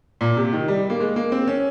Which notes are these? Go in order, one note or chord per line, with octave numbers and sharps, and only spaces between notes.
A#2
C3
D#3
G3
A#3
G#3
A#3
C4
C#4